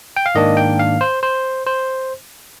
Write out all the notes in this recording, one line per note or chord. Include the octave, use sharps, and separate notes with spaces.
G5
F5
G#2 D#3 A#3 D4 D#5
G5
F5
C5
C5
C5